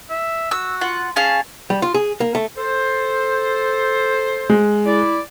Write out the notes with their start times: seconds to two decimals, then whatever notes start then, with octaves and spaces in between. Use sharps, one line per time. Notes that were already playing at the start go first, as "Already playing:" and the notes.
0.10 E5
0.51 F#4 E6
0.81 F4 F#5
1.16 C#4 G#4 F5 A5
1.70 G3
1.82 F4
1.94 G#4
2.20 A#3
2.35 A3
2.57 A4 C5
4.50 G#3
4.86 E4 D5